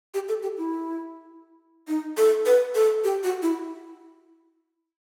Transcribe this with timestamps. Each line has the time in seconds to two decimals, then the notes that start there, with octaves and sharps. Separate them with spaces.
0.14 G4
0.29 A4
0.43 G4
0.58 E4
1.88 D#4
2.17 A4
2.46 B4
2.75 A4
3.04 G4
3.23 F#4
3.42 E4